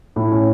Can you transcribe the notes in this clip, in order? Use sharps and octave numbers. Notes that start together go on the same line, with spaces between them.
A2
C#4